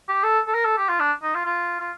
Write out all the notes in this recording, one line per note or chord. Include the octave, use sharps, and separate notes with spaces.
G4
A4
A4
A#4
A4
G4
F4
D4
D#4
F4
F4
F4